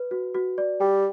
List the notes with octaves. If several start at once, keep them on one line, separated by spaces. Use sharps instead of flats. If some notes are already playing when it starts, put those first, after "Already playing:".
Already playing: B4
F#4
F#4
D5
G3 G5